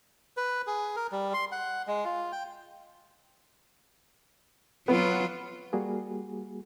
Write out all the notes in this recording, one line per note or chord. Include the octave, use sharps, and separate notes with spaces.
B4
G#4
A#4
G3
C6
F#5
G#3
F4
G5
F#3 B3 F4
G3 A#3 F#4 G#4